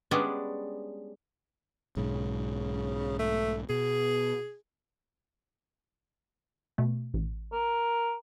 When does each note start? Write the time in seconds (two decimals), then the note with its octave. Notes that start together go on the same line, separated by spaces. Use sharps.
0.11 G3 G#3 B3 C#4 D4
1.97 B1 G#2 C#3
3.19 A3
3.70 B2 G#4
6.78 B2 A3
7.14 A1
7.53 A#4